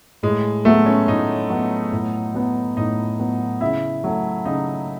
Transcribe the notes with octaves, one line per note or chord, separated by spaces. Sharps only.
A2 G#3
F#3 A3 B3
C#4
A2 D#4
F#3 B3
A2
F#3 B3
A2 D#4
F#3 B3
C#3 E4
F#3 A3
C#3 D#4